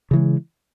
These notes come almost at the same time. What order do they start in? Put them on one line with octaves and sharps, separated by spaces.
C#3 E3 G#3